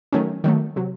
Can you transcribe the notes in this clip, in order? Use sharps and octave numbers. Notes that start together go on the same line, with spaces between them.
D#3 F#3 A3 C#4
D#3 F#3 A3
C3 F#3